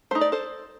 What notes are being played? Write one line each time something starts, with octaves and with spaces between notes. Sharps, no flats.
A3 D#4 C5
D5
A4 C5